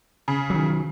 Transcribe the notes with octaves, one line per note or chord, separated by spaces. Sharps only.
C#3
D#3 F#3